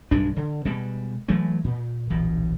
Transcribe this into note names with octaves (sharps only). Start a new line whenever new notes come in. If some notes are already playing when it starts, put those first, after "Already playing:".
B1 G2 G#3 D4
D3
B2 G3 G#3
E3 F#3 G#3 A3
A#2
D1 A#1 B2 E3